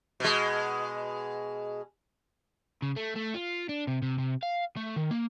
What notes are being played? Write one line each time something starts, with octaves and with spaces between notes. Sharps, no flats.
B2 G#3
C#3
A3
A3
F4
D4
C3
C3
C3
F5
A3
D#3
A#3